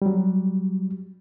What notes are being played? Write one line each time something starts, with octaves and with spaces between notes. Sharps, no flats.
F#3 G3